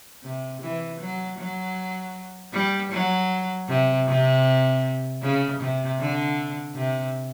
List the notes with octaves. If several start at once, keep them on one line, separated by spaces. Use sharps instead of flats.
C3
E3
F#3
F#3
G3
F#3
C3
C3
C#3
C3
D3
C3